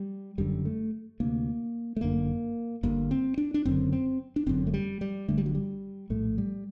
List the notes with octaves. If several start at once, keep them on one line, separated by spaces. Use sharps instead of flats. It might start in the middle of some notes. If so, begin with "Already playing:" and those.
Already playing: G3
F#1 F#2 D3 G3
A3
D2 C3 A#3
A3
G1 F#2 D3 A#3
G1 G2 D3 A#3
C4
D4
D4
F#1 F#2 D3 C4
C4
D4
G1 F#2 D3 C4
A3
G3
G3
G1 G2 D3 A3
G3
F#3
G3
A#1 A2 A3
G3